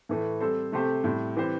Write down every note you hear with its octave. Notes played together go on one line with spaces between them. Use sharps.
A2 E3 A3
G3 C4 A4 C5
C3 A3 C4 G4 C5
A2 G3 C4
E3 G3 C4 G4 C5